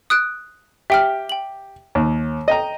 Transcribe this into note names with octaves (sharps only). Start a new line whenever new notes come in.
D#6 F#6 D7
G4 E5 G5 F6
G5 F#7
D#2
D#5 G5 A#5